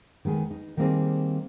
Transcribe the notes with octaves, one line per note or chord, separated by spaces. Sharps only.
D#3 G#3 B3 G#4
D#4
D#3 G3 A#3 C4 D#4 G#4